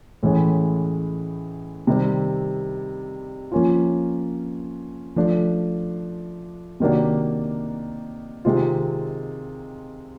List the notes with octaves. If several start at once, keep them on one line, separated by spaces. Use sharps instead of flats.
A2 E3 G#3 C#4
C3 D#3 G3 C4
F3 A#3 C#4 F4
F3 A3 D4
C3 D#3 F#3 A#3 D4
C3 D#3 G#3 C4 F4